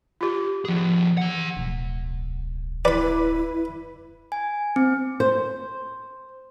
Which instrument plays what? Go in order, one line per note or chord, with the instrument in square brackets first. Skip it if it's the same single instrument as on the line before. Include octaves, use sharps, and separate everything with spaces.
[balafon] F4 G4
[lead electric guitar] F3 G#4
E3 F#5
[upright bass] D1 B1
[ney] E4 [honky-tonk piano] B4 [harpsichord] D5 B5
[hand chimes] G#5
C4
[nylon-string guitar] C5